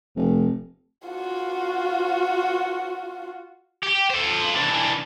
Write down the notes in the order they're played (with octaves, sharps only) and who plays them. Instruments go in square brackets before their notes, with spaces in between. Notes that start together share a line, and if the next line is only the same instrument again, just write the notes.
[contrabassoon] F1
[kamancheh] F4 F#4
[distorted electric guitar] G4
A4 C5
E3 D4